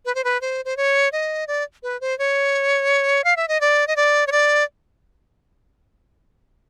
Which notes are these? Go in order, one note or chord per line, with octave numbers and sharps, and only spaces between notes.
B4
C5
B4
C5
C5
C#5
D#5
D5
B4
C5
C#5
F5
E5
D#5
D5
D#5
D5
C#5
D5